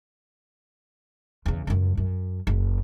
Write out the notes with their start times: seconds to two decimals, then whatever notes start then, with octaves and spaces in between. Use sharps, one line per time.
1.46 E2 C#3
1.67 C#2 F#2
1.97 F#2
2.47 F#1